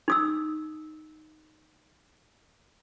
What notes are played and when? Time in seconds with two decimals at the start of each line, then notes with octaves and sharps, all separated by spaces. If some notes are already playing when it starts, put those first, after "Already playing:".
0.08 D#4 D#6 E6